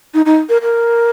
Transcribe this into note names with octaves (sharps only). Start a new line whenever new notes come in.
D#4
D#4
A#4
A#4